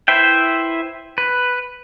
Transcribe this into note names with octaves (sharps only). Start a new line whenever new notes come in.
E4 B4 C5 E5 G5
B4